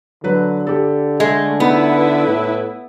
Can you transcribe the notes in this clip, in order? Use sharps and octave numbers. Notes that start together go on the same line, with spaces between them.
D3 F#3 B4
G4 A4
G#3 A3 E5
B3 D#4 E4 B4 E5
A2